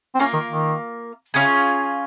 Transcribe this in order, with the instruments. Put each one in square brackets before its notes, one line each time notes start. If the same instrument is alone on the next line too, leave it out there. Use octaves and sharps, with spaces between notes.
[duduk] C4
[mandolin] A#3 F4 A#4 [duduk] C#4
[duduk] D#3
D#3
[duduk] C#3 [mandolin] C#4 F4 G#4